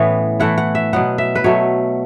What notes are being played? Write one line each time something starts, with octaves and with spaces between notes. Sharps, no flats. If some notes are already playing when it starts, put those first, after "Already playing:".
Already playing: A2 E3 B3 C#4 B4 C#5 E5
E3 A3 E4 F#5
F#5
E5
B2 F#3 B3 F#5
E5
B4
B2 F#3 A3 C#5